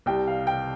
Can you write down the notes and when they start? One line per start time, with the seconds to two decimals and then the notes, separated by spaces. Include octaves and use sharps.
0.06 C2 C3 G3 G5
0.27 F5
0.47 G5